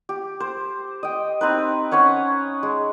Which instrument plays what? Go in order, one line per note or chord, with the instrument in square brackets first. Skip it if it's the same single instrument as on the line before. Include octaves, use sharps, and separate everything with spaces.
[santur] G4
C5
D#5 G5
C4 D#4 B4
C#4 B4 C#5 F#5
G#3